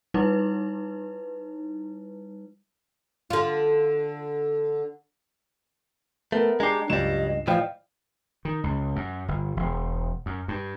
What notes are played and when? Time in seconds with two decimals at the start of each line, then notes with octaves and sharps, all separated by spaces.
0.14 G3 D#4 E4 B4
3.30 D3 F4
6.32 A3 B3 A#4
6.60 G#3 D4 G4 A#5 C7
6.90 C#2 G2 F#3 G3 D#5 E7
7.47 A2 E3 F3 D5 D#5 F5 G5
8.45 D#3
8.64 C#2
8.96 F#2
9.28 G1
9.57 E1
10.26 F#2
10.48 G2